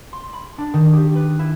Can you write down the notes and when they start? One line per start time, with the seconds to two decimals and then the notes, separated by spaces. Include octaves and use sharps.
0.13 C6
0.33 B5
0.58 D4
0.74 D#3
0.93 G4
1.15 B4
1.39 E4